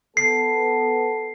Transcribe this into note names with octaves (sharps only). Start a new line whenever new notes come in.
B3 A4 C7